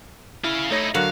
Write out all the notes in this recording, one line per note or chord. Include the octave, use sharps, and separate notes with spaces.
C#4 E4 F5
A3 D#4 E4 C#5 A#6
D3 F#3 F#4 A#4 F5